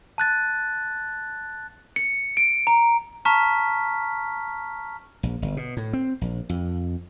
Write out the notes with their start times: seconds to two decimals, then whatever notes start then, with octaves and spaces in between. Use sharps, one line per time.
0.18 A5 F#6 A6
1.96 C#7
2.37 D7
2.67 A#5
3.25 A5 A#5 C#6 F6 B6
5.23 A#1
5.42 G1
5.57 B2
5.77 A2
5.93 C4
6.21 A#1
6.49 F2